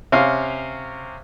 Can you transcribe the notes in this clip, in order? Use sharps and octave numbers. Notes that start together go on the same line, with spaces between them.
C3 C#4 F5